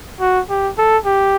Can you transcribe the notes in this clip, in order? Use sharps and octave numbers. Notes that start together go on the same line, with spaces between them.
F#4
G4
A4
G4